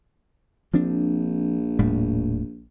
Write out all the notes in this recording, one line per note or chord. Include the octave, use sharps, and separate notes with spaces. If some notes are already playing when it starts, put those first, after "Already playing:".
A#1 F3 C4 D4
D#1 A2 G3